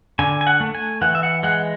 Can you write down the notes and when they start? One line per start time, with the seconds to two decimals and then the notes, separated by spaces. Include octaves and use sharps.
0.19 D3 G#5
0.41 G#5
0.47 F#5
0.60 A3
0.75 G#5
1.01 E3 F#5
1.15 E5
1.23 F#5
1.43 G#3 F#5